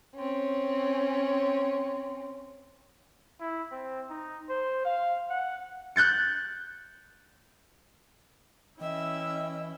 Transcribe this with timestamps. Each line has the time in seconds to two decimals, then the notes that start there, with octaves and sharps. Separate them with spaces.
0.15 C4 C#4
3.40 E4
3.71 C4
4.10 D#4
4.49 C5
4.85 F5
5.30 F#5
5.96 F#6 G6 A6 C#7
8.81 E3 C#4 E4 D#5 E5 G5